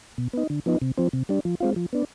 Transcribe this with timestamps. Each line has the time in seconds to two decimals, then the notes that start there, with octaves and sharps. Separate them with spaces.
0.18 B2
0.33 B3 D#4
0.50 D3
0.66 F3 B3 D#4
0.82 C3
0.98 F3 C4
1.13 C3
1.29 G3 D4
1.45 F3
1.60 G#3 C4 F4
1.76 F3
1.93 B3 D4